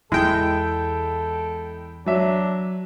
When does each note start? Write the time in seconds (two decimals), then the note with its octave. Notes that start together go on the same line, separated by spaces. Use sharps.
0.12 E2 G#3 E4 A4 G5
2.06 F#3 D4 E5